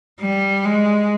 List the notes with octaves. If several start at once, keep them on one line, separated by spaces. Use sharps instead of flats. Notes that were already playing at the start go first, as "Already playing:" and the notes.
G3
G#3